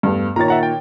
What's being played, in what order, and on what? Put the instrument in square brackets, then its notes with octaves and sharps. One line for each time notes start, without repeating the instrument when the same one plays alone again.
[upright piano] E2 G2 A3
[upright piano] A#2 D#3 C#5 [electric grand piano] A#5 A6
[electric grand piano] E5 F#5 A#5
G5